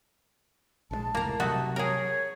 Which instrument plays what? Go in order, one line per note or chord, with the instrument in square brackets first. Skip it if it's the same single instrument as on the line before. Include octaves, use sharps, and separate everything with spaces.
[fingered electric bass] A#1 C#3 G#3 [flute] A5
[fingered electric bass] F1 C#2 A2 [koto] A#3 A#5
[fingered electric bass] C3 F#3 G3 [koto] A3 D#4 F#4
[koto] G#4 A#4 [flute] C#5